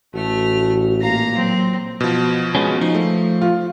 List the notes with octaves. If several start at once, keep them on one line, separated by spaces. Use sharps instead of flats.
A1 A3 F#4 F6
A#2 F5 A#5 A#6
F#3 C4
B2 F3
G#3 B3 C#4
F3 D#4
A3
F4